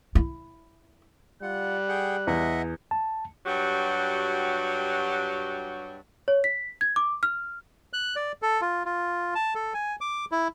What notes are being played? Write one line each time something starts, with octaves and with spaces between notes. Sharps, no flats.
E4
G3 F4 F#5 F#6
G#4 F#5 G5
E2 D#5 E5 F#5
A5
G2 F#3 F#4 G4
C#5
B6
G#6
D6
F6
F#6
D5
A4
F4
F4
A5
A4
G#5
D6
E4